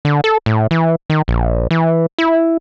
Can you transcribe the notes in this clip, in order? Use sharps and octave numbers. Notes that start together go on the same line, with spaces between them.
D3
A4
A2
E3
D#3
A#1
E3
E4